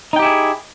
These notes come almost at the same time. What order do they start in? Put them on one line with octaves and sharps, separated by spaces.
D#4 G5 G4 E4 G#4